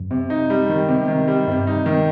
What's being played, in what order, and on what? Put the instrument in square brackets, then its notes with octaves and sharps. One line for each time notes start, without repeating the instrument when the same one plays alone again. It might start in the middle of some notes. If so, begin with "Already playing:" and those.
Already playing: [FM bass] F#2
[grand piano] C3
D#4
G3
D#3
C3
D#3
G3
[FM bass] G2 [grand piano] C3
[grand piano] D#4
D#3